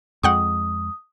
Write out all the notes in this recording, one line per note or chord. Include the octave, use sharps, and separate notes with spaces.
F2 G#3 F#5 G5 C#6 D#6